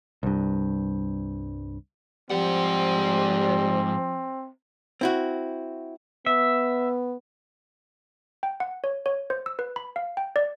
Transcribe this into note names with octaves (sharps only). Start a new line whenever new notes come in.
C2 G2
G#2 F3 G3 C4 F#5
C4 E4 F#4
B3 E5
G5
F#5
C#5
C#5
C5
E6
B4
B5
F5
G5
D5